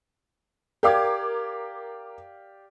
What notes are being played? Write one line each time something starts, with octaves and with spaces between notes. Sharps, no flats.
G4 A#4 D5 F5 D6 G#6